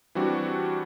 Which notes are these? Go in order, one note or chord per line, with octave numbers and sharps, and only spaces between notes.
E3 G3 C4 D4 F#4 G4